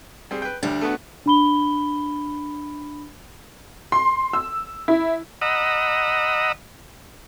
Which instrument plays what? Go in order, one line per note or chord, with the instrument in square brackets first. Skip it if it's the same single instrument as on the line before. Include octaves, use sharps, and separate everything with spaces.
[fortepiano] G3 C4 G#4
B4 G5
[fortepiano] D2 G3 [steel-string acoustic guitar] D4
[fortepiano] A3 B3 F#4
[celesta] D4 B5 G7
[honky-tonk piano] C6
E6
E4
[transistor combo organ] D#5 F#5 A#5 B5 D#6 E6